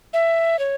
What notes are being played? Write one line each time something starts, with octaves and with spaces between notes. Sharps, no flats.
E5
C#5